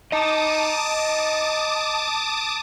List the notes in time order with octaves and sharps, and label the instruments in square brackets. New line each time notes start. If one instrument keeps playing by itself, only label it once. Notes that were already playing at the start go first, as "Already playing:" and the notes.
[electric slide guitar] D#5 A#5 [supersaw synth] A5 D6 D#6